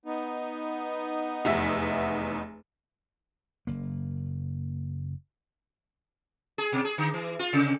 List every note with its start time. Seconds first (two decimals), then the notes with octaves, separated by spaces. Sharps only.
0.06 B3 D#4
1.45 F1 E2 E5
3.67 F#1 A#3
6.58 G#4
6.72 B2
6.85 G#4
6.98 D3
7.14 E3
7.39 F4
7.53 C3